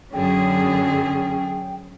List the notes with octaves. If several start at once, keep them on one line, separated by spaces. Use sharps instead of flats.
F#2 D3 C#4 G#4 G5